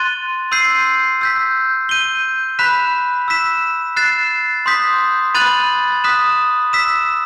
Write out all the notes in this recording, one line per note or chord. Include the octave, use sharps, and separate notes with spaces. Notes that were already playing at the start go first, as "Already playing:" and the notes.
Already playing: C6 F#6 A6 D#7 G7
C6 E6 G6 C7 D#7
E6 G6 B6
G6 D#7 G7
B5 F#6 B6 E7
E6 B6 E7
F#6 A6 C7 E7
C6 D#6 G6 B6
B5 F#6 A6 D#7 F#7
D#6 F#6 B6 E7
E6 B6 E7